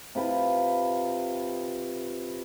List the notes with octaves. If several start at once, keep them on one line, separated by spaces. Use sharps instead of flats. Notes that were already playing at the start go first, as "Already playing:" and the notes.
C3 F4 B4 G5